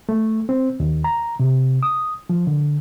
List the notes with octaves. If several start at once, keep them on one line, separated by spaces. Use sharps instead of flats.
A3
C4
D#2
A#5
C3
D#6
F3
D3